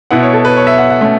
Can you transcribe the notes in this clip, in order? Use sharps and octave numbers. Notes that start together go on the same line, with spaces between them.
B2 B3 E4 F#5
C#5
A4
B4
C#5
E5
F#5
F#5
B2 A3 C#4